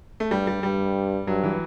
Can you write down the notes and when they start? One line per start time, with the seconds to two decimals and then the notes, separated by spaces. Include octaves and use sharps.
0.20 A3
0.31 G2 G3
0.47 G3
0.63 G2 G3
1.27 G2 F#3
1.44 E3